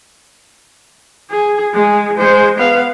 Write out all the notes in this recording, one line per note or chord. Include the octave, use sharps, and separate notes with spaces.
G#4
G#3 G#4
G#3 C5
B3 F5